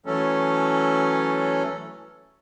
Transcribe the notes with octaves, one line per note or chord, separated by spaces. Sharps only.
E3 F#3 A3 C#4 A4